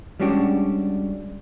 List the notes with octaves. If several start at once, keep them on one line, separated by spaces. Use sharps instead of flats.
G3 G#3 C#4 D4 F#4 G4